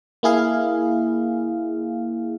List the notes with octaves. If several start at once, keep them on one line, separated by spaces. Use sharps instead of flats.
A#3 E4 G#4 F5